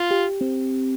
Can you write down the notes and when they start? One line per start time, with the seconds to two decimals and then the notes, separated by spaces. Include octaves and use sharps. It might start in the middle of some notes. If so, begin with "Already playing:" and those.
Already playing: F4
0.11 G4
0.41 C4